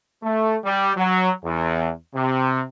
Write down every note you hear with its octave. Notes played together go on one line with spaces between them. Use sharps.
A3
G3
F#3
E2
C3